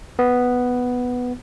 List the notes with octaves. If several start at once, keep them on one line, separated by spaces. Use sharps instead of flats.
B3